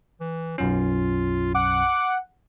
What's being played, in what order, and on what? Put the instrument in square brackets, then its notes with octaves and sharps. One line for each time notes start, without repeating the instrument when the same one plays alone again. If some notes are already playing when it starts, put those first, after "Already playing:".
[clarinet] E3
[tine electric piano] B1 F#2 C#4 [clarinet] F4
[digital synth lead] F#5 [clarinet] D6